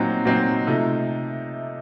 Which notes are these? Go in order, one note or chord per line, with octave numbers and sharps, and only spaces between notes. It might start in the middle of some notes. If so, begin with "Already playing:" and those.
Already playing: A#2 F#3 C4 D#4
A#2 F#3 C4 D#4
C3 F3 A3 D#4